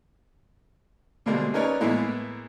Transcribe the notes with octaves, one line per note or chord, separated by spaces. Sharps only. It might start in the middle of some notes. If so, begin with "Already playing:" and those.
B2 D3 G3 G#3 A#3 C4
C#4 D#4 A#4 B4 C#5 D5
A2 E3 G#3 A#3 B3 E4